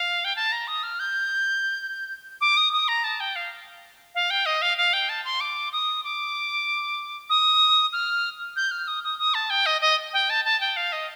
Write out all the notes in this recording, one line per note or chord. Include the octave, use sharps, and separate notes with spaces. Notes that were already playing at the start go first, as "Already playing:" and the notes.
Already playing: F5
G5
A5
A#5
D#6
F6
G6
D6
D#6
D#6
A#5
A5
G5
F5
F5
G5
D#5
F5
F5
G5
A5
C6
D6
D#6
D6
D#6
F6
G6
F6
D#6
D#6
D#6
A5
G5
D#5
D#5
G5
A5
A5
G5
F5
D#5